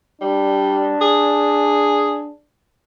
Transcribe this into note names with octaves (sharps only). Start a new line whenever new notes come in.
G3 D4
G#4